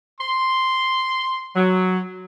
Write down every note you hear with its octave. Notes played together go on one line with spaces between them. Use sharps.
C6
F#3